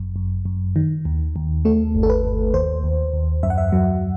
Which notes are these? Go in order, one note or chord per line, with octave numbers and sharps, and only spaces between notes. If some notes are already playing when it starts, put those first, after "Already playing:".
Already playing: G1 F#2
F#2
F#2
D#3
D#2
D#2
A3 A4
G1
A4
B4
G1
D#2 C5
D#2
D#2
F#2 E5
F#5
E5
F#3